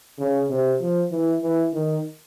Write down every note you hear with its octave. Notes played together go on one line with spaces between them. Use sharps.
C#3
C3
F3
E3
E3
D#3